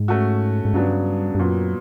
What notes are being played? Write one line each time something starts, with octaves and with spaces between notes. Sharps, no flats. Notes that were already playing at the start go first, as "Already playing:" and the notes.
Already playing: G#2
A3 C#4 F#4
G#2
G2 C#3 F#3 B3 D4
G2
F#2 A#2 F#3 B3